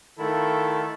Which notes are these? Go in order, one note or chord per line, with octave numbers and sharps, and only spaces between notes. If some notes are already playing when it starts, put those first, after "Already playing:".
D#3 A3 E4 F4 A4